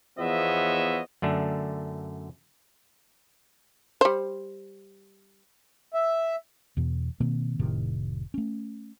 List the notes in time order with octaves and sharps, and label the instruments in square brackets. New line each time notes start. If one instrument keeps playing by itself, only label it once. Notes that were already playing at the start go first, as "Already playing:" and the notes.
[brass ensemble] E2 F3 B3 C#5 D#5 E5
[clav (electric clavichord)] F#2 D3 A3 D4
[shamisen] G3 C5
[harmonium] E5
[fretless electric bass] E2 B2 E3
B2 D#3 A#3 C4
F1 A2 C3 D#3
A3 C#4